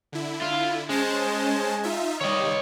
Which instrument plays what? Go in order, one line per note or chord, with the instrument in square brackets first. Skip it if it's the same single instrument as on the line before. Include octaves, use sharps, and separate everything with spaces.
[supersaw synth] D3 E4
[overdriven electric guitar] F4
[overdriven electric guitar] G#3 [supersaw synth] C#4 C5 A5
[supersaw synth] D#4 F4 E5
[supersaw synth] D#3 G3 [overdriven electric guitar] C#5 D#5